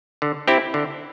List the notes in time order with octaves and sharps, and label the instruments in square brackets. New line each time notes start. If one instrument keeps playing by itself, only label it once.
[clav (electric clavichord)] D3
C4 E4 G4
D3